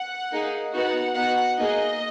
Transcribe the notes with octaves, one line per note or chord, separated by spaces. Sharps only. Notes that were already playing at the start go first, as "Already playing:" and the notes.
Already playing: F#5
A#3 D#4 G#4
B3 D#4 F#4 F#5
B3 D#4 F#4 F#5
A#3 D#4 G#4 D#5